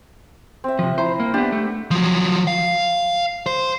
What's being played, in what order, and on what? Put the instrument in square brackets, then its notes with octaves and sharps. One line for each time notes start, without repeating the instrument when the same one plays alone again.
[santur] C4 E5
[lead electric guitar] C3 F3
[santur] E4 A#5 [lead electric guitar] C5
[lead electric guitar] A#3
[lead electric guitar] B3 D4 [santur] G4
[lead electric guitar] A3
[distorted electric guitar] F3 F#3
F5
C5